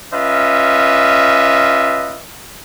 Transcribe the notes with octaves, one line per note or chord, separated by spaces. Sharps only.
C#4 F4 B4 D#5 E5